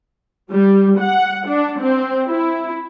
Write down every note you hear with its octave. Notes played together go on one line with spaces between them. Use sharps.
G3
F#5
D4
C4
E4